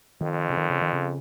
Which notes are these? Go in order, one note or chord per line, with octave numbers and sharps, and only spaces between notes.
F2 D#3
C#3
D#3
C#3
D#3
C#3